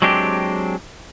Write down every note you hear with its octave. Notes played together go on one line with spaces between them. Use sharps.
F#3 G#3 C4 D4 G4